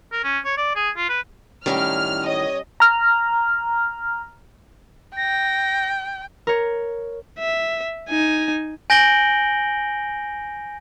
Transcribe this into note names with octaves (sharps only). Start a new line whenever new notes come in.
A#4
C#4
C#5
D5
G#4
F4
B4
F#2 A2 D#3 G3 C#4 F6
C#5 D#5
A#5 F6
G5 A#6
A#4 C#5
E5
D#4 G#5
G#5 G6 A#6 D7 F#7 G7